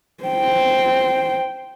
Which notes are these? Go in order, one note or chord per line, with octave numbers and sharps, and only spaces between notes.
C5 G5